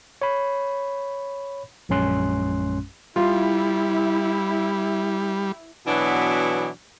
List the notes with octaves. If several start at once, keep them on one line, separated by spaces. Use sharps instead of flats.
C#5 B5
A#1 F#2 G#3 C#4 C6 F#6
G3 E4 F4
B2 E3 F#3 B3 D4 E4